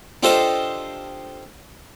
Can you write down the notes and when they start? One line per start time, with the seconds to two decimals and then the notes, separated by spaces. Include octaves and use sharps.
0.23 D4 F4 G4 A4 C5 D#5